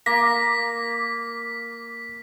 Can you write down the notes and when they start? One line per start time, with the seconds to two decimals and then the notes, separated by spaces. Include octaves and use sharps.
0.06 A#3 A#6 B6